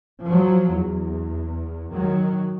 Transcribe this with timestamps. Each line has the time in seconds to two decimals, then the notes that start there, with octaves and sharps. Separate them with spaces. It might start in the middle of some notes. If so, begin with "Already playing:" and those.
0.24 F3 F#3
0.73 E2
1.92 D#3 F#3